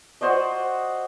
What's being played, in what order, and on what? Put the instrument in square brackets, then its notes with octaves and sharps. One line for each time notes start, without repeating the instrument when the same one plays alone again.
[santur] F#4 C5 D5 D#5